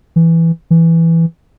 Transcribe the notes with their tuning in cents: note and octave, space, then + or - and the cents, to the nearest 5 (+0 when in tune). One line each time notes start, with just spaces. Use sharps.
E3 +5
E3 +5